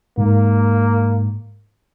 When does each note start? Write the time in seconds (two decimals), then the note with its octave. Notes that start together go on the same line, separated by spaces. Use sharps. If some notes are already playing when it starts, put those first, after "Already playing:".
0.18 G#2 A#3